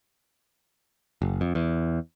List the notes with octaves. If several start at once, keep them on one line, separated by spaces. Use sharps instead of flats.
F#1
F2
E2